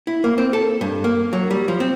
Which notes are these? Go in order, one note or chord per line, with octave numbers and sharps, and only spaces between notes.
E4
A#3
C4
A4
G2
A#3
F#3
G3
F3
C4